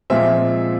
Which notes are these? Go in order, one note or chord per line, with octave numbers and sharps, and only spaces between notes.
A#2 F3 G#3 C4 E5